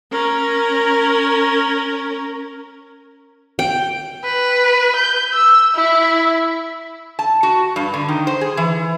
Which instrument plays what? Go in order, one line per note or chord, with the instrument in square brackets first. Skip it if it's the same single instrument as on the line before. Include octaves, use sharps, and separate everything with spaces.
[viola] C#4 A#4
[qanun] G5
[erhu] B4
G6
E6
E4
[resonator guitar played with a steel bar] A5
F#4
G2
D3
D#3
C5
G#4
E3